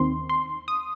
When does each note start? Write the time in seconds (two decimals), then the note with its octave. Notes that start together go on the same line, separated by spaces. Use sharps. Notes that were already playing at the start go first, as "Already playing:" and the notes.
Already playing: D#2 D#3 C4 C6
0.29 C6
0.68 D#6